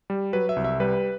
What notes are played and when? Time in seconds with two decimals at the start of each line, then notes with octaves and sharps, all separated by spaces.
0.10 G3
0.33 F#3 B4
0.49 E5
0.56 C2
0.64 E5
0.80 G3 B4